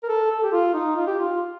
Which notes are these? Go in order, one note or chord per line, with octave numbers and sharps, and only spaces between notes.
A#4
A4
A4
G4
F4
D#4
F4
G4
F4